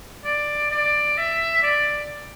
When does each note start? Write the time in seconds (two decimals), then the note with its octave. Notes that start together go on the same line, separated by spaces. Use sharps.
0.25 D5
0.71 D5
1.17 E5
1.62 D5